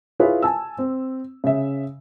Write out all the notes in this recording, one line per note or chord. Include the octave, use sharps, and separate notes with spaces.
E4 F4 G#4 B4 C#5
G#5 A5 E6
C4
C#3 E5